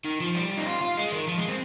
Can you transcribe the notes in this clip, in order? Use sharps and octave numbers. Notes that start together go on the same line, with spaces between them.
D#3
F3
G3
D#4
F4
F4
G#3
D#3
F3
G#3
C4